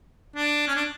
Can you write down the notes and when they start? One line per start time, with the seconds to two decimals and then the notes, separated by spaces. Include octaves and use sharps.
0.35 D4
0.67 C#4
0.75 D4